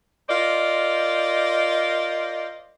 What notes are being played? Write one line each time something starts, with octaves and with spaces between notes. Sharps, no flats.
F4 A#4 C5 D5 D#5